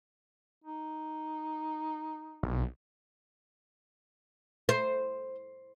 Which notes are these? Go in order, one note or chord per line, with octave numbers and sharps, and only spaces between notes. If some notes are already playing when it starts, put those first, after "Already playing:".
D#4
B1
C5